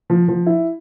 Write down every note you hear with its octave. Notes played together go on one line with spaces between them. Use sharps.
F3
F3
E4